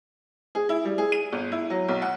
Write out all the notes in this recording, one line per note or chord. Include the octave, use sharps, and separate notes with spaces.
G#4
E4
G3
G#4
D#7
G1
E4
F#3
B1
F#5